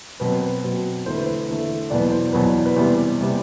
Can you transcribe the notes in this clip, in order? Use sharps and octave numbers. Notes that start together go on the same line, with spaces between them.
B2 F#3 C4 B4
B4
B2 F#3 C4
E2 D3 A3 C5
B4
C5
E2 D3 A3
E2 B2 F#3 B3 D5
C5
E2 B2 F#3 B3 B4
B4
E2 C3 G3 B3 C5
C3 G3 B3